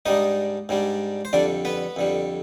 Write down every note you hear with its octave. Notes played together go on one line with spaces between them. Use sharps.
G#2 G3 D4 D#4 D#5
G#2 G3 D4
C5
F2 D3 G3 D4 D5
B3 B4
F2 D3 G3